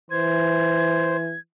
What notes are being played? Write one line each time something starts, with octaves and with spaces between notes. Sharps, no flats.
E3 C5 G#6